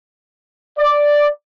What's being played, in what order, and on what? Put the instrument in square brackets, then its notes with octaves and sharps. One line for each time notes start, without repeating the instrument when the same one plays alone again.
[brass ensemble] D5